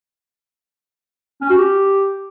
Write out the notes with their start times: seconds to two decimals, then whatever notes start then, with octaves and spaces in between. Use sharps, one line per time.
1.41 C#4
1.50 F#4
1.58 G4